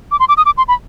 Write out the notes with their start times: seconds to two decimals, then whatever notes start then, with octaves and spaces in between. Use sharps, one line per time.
0.11 D6
0.20 C6
0.29 D6
0.37 D#6
0.46 D6
0.58 C6
0.68 B5